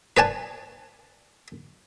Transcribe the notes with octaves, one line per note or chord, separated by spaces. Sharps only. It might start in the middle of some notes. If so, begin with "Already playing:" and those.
B4 D5 G#5 A5